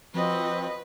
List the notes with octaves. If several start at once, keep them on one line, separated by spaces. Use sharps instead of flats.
F3 C4 F#4 B4 D#5